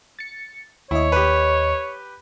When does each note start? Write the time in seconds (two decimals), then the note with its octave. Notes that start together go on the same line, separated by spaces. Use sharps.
0.19 A6 C#7
0.91 D#2 E4 C#5 D#5
1.12 G4 B4